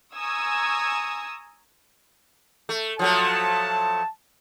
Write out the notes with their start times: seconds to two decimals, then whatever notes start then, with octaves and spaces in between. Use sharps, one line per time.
0.14 G#5 A#5 C#6 D#6 E6 G#6
2.69 A3
2.99 F3 F#3 A3 A5